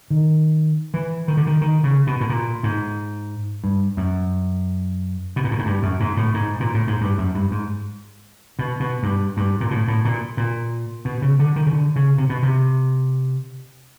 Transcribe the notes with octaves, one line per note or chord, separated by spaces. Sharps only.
D#3
E3
D#3
D3
D#3
D#3
C#3
B2
A2
A#2
G#2
G2
F#2
B2
A#2
A2
G#2
G2
F#2
G#2
A2
G#2
A#2
A2
G#2
G2
F#2
G2
G#2
B2
B2
G2
G2
A#2
A2
A2
A#2
A#2
B2
C#3
D3
D#3
C#3
D3
C#3
C3
B2
C3